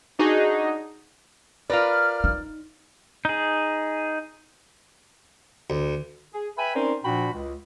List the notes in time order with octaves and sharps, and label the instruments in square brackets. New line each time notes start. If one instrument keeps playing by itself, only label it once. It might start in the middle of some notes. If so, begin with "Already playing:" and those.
[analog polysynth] D4 D#4 F#4 G#4
[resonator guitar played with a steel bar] F4 A#4 B4 [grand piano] D5 [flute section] F6
[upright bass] D#4
[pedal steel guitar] D#4 G#4
[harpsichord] D2
[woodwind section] G#4
B4 E5 G5 G#5 B5
C4 C#4 D#4 A#4 C5 D5
A#2 F3 D4 F#4 G5 B5
C#2